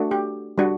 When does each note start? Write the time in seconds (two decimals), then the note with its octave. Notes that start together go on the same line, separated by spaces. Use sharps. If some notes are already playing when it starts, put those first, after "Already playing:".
Already playing: A3 D4 F#4
0.11 G4
0.58 G3 D4 F#4